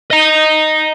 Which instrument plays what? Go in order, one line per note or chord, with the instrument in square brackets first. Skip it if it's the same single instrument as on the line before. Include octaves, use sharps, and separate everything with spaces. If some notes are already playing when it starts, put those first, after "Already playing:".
[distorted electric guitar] D#5 A#5